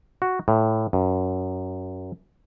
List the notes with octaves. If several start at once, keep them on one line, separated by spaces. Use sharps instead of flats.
F#4
A2
F#2